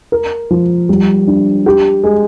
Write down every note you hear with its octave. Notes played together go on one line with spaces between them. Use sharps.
A#4
F3
G3
D4
G4
G#3